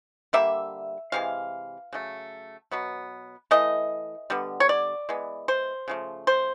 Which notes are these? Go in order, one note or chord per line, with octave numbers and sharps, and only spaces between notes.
D3 G3 A#3 E5
C3 E3 G#3 F5
C#3 F#3 A3
B2 F#3 B3
E3 A3 D#5
D3 G3 B3
C#5
D5
E3 G#3 B3
C5
C#3 F3 A3
C5